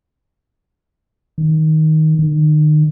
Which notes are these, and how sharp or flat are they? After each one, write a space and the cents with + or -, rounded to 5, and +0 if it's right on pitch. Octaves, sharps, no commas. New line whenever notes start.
D#3 +10
D#3 -35